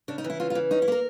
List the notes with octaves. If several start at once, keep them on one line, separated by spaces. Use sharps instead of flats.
C#3 D4
D#4
E3
E4
C#3 F4
F4
E3
C#4 D#4
E4
A#3 A#4